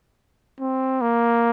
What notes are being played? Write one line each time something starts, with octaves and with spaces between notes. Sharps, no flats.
C4
A#3